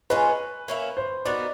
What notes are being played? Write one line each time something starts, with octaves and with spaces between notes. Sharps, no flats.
G#3 C#4 F4 B4
A#3 C#4 E4
C5
B3 D#4 F#4 A#4 D5